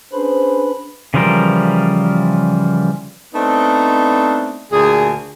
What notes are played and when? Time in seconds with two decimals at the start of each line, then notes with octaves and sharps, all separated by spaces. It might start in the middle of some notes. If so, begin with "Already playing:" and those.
0.12 C#4 D4 G#4 B4 C5 B5
1.14 C#3 E3 F3 G3 A#4
3.33 A3 B3 C4 D4 D#4
4.72 D2 A#2 G#4